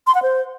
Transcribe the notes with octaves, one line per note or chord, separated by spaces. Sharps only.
C6
F#5
C5